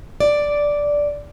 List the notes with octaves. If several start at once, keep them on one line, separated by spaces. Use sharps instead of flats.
D5